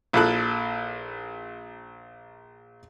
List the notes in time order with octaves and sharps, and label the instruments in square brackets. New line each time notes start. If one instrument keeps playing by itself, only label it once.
[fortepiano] A#1 A#2 E4 A4 F#6